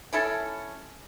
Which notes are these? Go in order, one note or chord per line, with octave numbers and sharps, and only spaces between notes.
C#4 E4 A4 A5